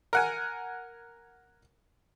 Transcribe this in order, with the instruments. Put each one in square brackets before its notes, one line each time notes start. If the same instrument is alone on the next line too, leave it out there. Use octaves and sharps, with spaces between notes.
[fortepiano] A#4 F#5 G#5